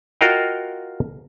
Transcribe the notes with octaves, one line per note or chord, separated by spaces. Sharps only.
F4 F#4 A#4 D#5 F5 G5